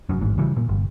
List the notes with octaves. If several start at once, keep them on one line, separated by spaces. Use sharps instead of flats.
F1 F#2
A1 G#2
C#3 E3 F#3 G3
A#2
G1